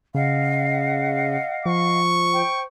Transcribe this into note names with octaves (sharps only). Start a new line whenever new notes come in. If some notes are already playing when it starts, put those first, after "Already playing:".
C#3 D#5 F5 F#5
F3 C#6
C5 G5